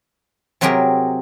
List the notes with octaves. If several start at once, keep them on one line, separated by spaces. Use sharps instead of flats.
C3 F#3 C4 G4 G#4 A#4